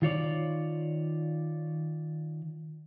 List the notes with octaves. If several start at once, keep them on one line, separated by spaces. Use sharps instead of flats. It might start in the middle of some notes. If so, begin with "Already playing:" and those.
D#3 F4 C#5 D5